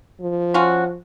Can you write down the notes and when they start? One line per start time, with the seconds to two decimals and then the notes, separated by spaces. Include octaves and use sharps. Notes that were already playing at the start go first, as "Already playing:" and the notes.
0.21 F3
0.54 C#4 F4 F#4